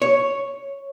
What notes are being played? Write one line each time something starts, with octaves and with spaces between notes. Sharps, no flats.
C#5